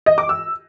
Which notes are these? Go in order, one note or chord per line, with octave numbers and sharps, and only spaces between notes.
D#5
D6
E6